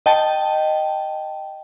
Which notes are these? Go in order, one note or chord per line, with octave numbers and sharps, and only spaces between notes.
D#5 G5 A5